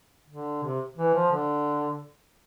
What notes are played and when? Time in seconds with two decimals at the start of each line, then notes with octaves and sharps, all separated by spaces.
0.29 D3
0.63 C3
0.97 E3
1.15 F3
1.32 D3